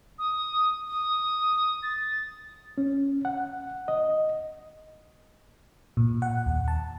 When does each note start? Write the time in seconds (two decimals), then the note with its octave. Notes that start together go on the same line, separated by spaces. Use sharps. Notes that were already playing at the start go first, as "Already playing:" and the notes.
0.19 D#6
0.87 D#6
1.83 A6
2.78 C#4
3.25 F#5
3.88 D#5
5.97 A#2
6.22 F#5
6.46 D#2
6.68 A5